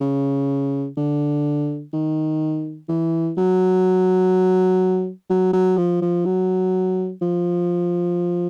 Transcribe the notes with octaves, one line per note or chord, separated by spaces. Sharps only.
C#3
D3
D#3
E3
F#3
F#3
F#3
F3
F3
F#3
F3